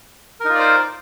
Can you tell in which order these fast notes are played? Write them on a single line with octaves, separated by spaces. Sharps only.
A#4 D#4 F4 D5 C5